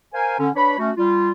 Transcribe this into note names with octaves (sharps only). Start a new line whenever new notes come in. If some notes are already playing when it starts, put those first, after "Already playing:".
A#4 C5 F5 G#5
D3 C#4
D4 B4 C#5 B5
A3 C#4 F#4
G3 F4